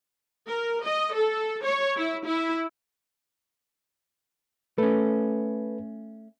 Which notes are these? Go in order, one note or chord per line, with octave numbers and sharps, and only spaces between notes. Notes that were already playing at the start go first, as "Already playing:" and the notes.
A#4
D#5
A4
C#5
E4
E4
A3 C#4 A4 B4